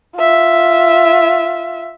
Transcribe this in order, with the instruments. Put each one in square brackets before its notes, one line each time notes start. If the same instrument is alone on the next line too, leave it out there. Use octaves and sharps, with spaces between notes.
[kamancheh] F4 E5